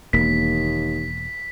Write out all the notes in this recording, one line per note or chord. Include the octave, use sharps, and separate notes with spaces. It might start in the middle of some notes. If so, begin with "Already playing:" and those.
E1 D#2 A#3 B6